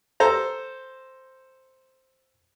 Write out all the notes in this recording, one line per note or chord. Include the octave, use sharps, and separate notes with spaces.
A4 C5 A#5